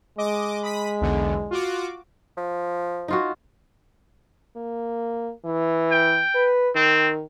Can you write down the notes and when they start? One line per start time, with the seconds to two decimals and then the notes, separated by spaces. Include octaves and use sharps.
0.18 G#3 D#5 D6
0.63 B5 D#6 B6
1.01 B1 E2 D3
1.51 F4 F#4 D6
2.37 F3
3.08 D#4 F4 F#4
4.56 A#3
5.45 E3
5.91 G5
6.35 B4
6.75 D#3 C4